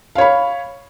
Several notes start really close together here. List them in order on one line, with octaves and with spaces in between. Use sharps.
F5 C#5 B5